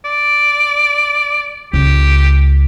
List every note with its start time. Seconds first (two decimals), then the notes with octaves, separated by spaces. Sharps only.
0.05 D5
1.73 C#2 G4